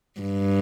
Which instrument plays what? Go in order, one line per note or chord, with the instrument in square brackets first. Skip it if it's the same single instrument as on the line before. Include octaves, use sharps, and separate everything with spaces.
[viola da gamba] G2